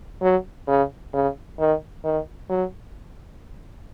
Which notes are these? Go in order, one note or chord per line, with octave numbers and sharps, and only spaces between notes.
F#3
C#3
C#3
D#3
D#3
F#3